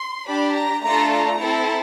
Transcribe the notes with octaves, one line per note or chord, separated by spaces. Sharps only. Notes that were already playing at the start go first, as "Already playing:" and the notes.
Already playing: C6
D4 G4 B5
A#5
A3 D4 F4 A4 A#5
A#5
C4 E4 A4